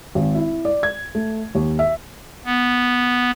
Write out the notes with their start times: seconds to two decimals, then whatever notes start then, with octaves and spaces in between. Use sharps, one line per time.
0.15 G#1
0.35 E4
0.65 D5
0.83 G#6
1.15 A3
1.55 D#2
1.79 E5
2.45 B3